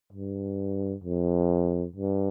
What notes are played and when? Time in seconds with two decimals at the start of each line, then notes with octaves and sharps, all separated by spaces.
0.13 G2
1.04 F2
1.96 G2